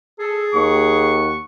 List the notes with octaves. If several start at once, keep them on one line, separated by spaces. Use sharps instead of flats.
G#4 A4
D#2 F#5 C#6